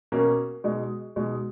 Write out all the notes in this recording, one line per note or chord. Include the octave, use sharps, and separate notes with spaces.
B2 A#3 C#4
B2 G#3 D#4
B2 G#3 D#4